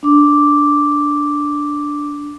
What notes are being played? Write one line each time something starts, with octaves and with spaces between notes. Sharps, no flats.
D4 D6